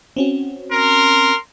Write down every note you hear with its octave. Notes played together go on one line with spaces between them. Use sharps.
C4 C#4 F#4
A#4 C6